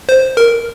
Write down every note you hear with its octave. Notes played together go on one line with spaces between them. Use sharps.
C5
A#4